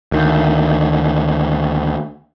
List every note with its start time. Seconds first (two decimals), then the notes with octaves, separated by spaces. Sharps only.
0.12 D2 D#3